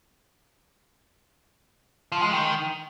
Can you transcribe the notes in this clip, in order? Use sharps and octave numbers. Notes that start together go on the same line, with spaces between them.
F3
G#3
D#3